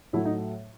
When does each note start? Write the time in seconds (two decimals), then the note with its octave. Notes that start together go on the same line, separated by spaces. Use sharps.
0.13 A2 F#3 A3 E4
0.25 D#4